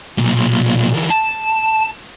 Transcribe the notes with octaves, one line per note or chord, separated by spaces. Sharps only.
B1 A#2
D2 E3
A5